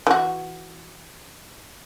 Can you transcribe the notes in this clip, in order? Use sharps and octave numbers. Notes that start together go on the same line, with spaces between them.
E3 F#4